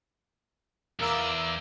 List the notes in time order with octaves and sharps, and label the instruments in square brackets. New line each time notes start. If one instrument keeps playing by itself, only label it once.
[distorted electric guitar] E2 [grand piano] A#4 F5 A#5 [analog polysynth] D6 E6